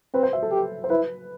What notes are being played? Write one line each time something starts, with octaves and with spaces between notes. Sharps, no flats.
C4 B4
C5
E5
A4
G4
C5
E4 B4